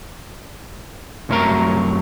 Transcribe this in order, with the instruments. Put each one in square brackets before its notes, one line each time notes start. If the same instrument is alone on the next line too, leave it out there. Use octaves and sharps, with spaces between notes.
[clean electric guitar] C2 F#2 F#3 A3 A#4 A#5